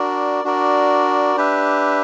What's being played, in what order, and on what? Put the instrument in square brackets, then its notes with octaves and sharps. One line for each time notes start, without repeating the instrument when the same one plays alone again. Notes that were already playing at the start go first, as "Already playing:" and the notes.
Already playing: [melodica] D4 F#4 A#4 D5
D4 F#4 A#4 D5
D4 G4 B4 E5